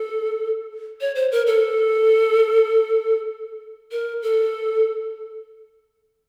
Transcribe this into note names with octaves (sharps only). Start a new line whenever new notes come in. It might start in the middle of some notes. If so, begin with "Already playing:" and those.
Already playing: A4
C#5
C5
A#4
A4
A#4
A4